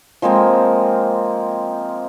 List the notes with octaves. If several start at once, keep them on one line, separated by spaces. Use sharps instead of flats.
F3 G#3 A#3 C4